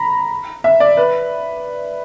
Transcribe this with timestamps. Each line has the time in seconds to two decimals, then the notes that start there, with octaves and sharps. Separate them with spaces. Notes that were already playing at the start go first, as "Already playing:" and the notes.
Already playing: A#5 B5
0.64 E5
0.80 D5
0.97 B4